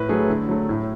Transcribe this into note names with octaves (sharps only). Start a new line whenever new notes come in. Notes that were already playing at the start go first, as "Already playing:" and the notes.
Already playing: A2 B4
F#3 A3 G#4
D3 E4
F#3 A3
A2